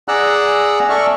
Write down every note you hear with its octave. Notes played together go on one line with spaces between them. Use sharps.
G#4 D5 F#5 A#5 E6 F#6
A4 D5 E5 C#6 F6